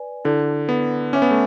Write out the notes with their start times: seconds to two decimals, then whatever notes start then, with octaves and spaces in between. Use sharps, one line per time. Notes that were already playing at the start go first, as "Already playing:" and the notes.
Already playing: B4 D5 G#5
0.25 D3 E4 A4 D5
0.69 B3
1.13 C#4 C#5 E5 G#5 D6
1.22 B3
1.31 A3